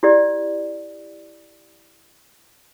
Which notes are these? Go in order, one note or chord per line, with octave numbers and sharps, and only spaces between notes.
E4 G4 D5